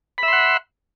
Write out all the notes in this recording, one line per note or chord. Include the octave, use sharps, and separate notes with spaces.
E5 F#5 B5 C6